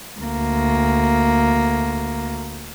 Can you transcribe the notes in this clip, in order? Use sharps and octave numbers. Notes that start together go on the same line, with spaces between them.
D2 A#3